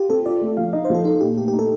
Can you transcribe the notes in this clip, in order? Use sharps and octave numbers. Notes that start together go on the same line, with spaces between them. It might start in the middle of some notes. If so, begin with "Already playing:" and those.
Already playing: F4 G4
C4 A4
F4 D5
A3
F3 F5
D#4 D#5
C5
F3 A4
D#4 A4
A#2 G4
A3 G4
G4
D#4
A4